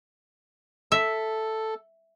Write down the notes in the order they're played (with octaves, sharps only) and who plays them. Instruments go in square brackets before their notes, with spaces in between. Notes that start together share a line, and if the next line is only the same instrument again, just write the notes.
[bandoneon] A4 [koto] E5